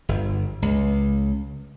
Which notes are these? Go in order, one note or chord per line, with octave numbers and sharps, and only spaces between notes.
G1
C#2